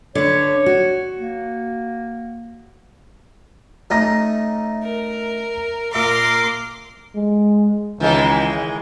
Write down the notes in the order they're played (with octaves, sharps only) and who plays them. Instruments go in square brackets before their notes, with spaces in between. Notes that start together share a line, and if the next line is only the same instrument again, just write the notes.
[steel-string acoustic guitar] D3 B4 [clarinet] C#5
[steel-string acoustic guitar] F#4
[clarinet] A#3
[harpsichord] A3 C#4 D#4 [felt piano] E5 A#5 A#6
[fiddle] A#4
[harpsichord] A#2 E5 A#5 [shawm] A#4 [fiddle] C6 D6
[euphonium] G#3
[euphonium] C#2 [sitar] D#3 E3 G#3